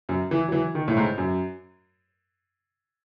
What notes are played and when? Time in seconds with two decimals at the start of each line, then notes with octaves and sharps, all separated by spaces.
0.09 F#2
0.31 E3
0.48 F#3
0.52 E3
0.75 D#3
0.88 A2
0.97 G#2
1.18 F#2